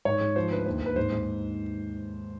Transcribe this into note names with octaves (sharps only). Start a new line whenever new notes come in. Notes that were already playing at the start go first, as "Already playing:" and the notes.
G#2 C#5
G#2
F3 C5
D2 B4
D#2 C5
D#2 B4
G#2 C5
G#2